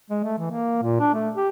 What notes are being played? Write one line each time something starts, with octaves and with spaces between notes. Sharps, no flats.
G#3
A3
E3
A#3
A#2
D4
A3
G4